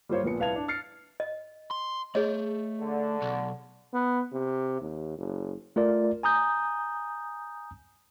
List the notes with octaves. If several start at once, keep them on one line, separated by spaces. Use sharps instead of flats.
G3 A#3 F4 C5 C#5
A#1 A#2 F3 B3 C#7
C2 B4 F5 A5 G#6 F7
D4
F6 A6 C7 C#7
D#5
C6
A3 G#4 C#5 D#5
D3
B1
B3
C3
D#2
F#1
A3 F4 A#4 D5
G#5 A#5 D#6 G6